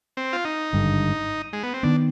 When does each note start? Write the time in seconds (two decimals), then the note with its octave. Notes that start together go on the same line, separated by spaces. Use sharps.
0.17 C4
0.33 F4
0.45 D#4
0.73 G#1 G2 D3
1.53 G#3
1.63 B3
1.73 C4
1.83 D#3 B3 D4